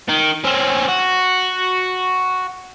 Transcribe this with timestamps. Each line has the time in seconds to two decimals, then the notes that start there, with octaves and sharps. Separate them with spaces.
0.09 D#3
0.44 C4 C#4
0.88 F#4